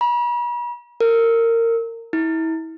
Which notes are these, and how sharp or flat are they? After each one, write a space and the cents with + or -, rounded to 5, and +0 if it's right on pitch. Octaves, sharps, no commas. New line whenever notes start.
B5 -45
A#4 -25
E4 -35